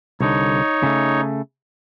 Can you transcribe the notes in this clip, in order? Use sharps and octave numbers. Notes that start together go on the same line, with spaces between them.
C2 D3 D#4 C#5
C#3 A3